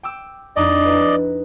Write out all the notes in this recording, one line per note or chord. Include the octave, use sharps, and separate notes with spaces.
G5 D6 E6
F2 D4 D#4 D5 D#5
D#4 E4 B4